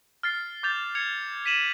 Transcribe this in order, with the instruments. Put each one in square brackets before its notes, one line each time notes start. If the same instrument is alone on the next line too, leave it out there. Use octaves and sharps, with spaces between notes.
[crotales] F6 A6 C7
D6 G6 A6 F7
G#6 C#7 F7
B6 D#7 E7 F#7